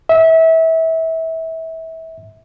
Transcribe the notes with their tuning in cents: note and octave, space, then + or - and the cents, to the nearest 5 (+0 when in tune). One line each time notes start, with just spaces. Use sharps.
E5 -25